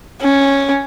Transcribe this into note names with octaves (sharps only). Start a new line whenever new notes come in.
C#4